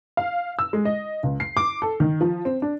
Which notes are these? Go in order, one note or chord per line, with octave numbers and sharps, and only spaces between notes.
F5
E6
G#3
D#5
C#2
C7
D6
A4
D#3
F3
C4
D4